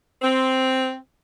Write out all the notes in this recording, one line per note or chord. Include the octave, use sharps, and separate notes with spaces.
C4